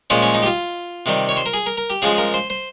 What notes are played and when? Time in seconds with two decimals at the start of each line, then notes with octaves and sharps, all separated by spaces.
0.10 A#2 F3 G#3 C#4
0.22 C#4
0.34 D#4
0.42 G4
0.46 F4
1.06 C3 D#3 G3
1.29 C#5
1.37 C5
1.46 A#4
1.53 G#4
1.66 A#4
1.77 A#4
1.90 G4
2.02 C#3 F3 G#3 G#4
2.18 A#4
2.34 C5
2.50 C5